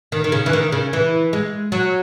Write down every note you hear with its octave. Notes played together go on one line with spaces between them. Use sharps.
D#3
D#3
C#3
E3
D#3
C#3
E3
G#3
F#3